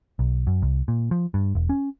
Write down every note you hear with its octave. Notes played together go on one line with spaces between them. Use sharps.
B1
F#2
C2
A#2
F3
G2
E1
C#4